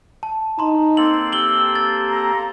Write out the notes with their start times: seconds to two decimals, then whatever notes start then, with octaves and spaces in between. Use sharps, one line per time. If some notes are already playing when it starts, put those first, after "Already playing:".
0.23 A5
0.59 D#4 A#5 C6
0.97 A#3 C4 A4 C6 F#7
1.32 G4 E6 F#7 G7
1.75 A6
2.10 A#5